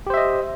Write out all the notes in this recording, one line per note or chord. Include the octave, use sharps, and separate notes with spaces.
G4 C5 D#5 E5